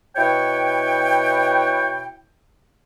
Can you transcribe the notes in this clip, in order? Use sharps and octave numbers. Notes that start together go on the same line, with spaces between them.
B2 E4 F#4 C#5 G5